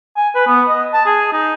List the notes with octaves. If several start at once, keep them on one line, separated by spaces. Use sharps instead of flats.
G#5
B4
B3
D#5
A5
G#4
D#4